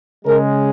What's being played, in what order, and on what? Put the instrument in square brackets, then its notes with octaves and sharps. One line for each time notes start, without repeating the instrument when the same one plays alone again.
[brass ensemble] C#3 G#3 A#4